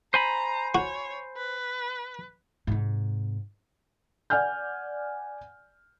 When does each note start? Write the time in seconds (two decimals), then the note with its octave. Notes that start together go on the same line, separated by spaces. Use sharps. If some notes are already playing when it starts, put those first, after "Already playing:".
0.14 C5 G#5 A#5 B5
0.75 F#4 C#5
1.37 B4
2.67 G#2 C3
4.30 D5 F#5 G#5 F6 G6